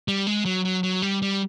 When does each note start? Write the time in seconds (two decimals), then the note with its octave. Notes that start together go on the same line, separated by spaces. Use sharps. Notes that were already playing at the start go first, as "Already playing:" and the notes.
0.08 G3
0.27 G#3
0.45 F#3
0.65 F#3
0.83 F#3
1.02 G3
1.22 G3